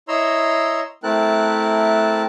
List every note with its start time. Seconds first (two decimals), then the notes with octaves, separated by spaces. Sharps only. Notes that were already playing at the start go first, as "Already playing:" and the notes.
0.08 E4 C#5 D#5 A#5 C6 E6
1.03 A3 C4 E4 A#4 A5 F#6